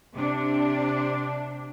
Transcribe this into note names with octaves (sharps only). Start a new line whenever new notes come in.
C3 D4